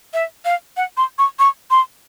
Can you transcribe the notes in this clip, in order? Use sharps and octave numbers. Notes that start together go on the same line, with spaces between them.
E5
F5
F#5
C6
C#6
C#6
C6